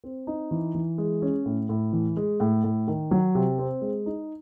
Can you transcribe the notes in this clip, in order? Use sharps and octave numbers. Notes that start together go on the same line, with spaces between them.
C4
D#4
E3
E3
G#3
C#4
A2
A2
E3
G#3
A2
A2
D#3
F#3
C3
C4
G#3
D#4